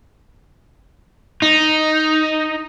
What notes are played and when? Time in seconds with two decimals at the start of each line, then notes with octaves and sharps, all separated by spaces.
1.42 D#4